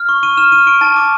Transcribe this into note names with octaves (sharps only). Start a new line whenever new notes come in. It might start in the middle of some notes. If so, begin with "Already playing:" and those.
Already playing: F6
C#6
C#6 D#7
F6 E7
F6 D#7
C#6 D7
A5 A6
D6